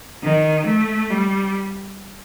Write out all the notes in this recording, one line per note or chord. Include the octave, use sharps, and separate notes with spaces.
D#3
A3
G3